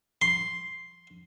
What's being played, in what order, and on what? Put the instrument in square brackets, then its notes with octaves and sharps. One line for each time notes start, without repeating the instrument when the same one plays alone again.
[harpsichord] C6